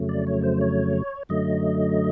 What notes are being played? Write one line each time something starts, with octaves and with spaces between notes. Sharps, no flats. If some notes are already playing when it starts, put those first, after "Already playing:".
Already playing: F2 C#3 F#3 A3
D5
C#5
C5
C#5
F#2 D3 F#3 A3 D#5